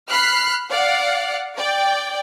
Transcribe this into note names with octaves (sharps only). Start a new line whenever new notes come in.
B5 F6 F#6 C7
D5 F5 F#5
D5 G5